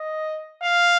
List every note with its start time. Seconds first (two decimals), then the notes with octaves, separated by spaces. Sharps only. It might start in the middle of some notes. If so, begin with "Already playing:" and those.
Already playing: D#5
0.62 F5